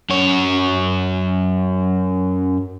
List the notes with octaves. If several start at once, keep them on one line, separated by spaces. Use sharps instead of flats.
F#2 C#5